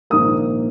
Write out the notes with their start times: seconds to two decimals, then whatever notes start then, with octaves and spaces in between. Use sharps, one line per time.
0.10 A#1 G#2 D#3 A#3 D#6